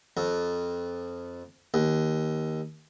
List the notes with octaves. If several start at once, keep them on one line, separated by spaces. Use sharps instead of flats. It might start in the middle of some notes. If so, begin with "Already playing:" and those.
F2
D#2